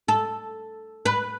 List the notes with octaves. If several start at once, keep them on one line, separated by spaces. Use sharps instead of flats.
A4
B4